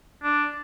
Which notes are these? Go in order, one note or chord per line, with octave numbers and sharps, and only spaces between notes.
D4